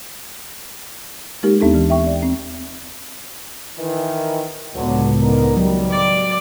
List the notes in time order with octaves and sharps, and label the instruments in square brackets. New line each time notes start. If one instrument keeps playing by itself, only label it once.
[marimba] G#3 A#3 D#4 G4 A#4
D#2 B3 C4 D4 D#4 A4
E3
E5 G5 C#6
D5
C4
[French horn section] D#3 E3
[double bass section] C#2 A2 B3 [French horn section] D3 F#3
[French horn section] D3 D#4 A#4
[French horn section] D#3 G3 [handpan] F#3
[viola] D5 D6